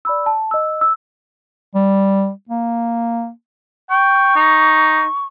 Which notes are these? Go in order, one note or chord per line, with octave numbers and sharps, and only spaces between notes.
D5 B5 E6
A5
D#5 E6
E6
G3
A#3
G5 C#6
D#4